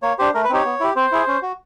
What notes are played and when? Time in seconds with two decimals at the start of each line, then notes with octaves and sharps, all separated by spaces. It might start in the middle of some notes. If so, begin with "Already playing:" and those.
0.03 A#3 C#5
0.19 D4 G4 C5
0.34 A3 A#4
0.44 B4
0.50 C4 D#4 G4 C#5
0.65 B3
0.80 E4 G4
0.96 C4 C5
1.12 E4 G#4
1.27 C#4
1.42 F#4